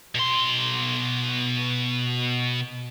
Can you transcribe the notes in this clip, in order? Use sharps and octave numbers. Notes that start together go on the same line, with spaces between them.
B2 C6